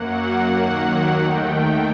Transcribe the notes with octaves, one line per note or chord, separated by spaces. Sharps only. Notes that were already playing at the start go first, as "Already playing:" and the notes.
Already playing: F#2 F#3 A#3 F#5
D#2 D#3 F#3 A#3
D#2 D#3 A3 G5